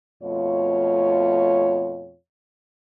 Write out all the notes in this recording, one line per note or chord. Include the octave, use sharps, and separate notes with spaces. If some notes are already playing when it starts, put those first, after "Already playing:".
F2 B2 A3 F4 C#5